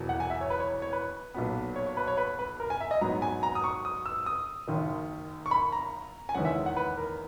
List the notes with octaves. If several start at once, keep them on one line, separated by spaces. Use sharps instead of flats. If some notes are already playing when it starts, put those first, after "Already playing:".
Already playing: E1 E2 B2 F#3
F#5
G#5
E5
C#5
B4
C#5
C#5
B4
B1 A#2 F#3 B3
C#5
C#5
B4
C#5
B4
B4
A#4
G#5
E5
D#5
G#2 F#3 B3 A#5
G#5
A#5
D#6
C#6
D#6
E6
D#6
F#1 F#2 D#3
C#6
B5
A#5
G#5
F#1 E2 D#3 G#3 C#4 F#5
E5
F#5
B4
A#4